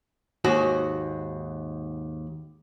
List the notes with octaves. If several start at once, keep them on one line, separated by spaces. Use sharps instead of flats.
D#2 G#2 F#4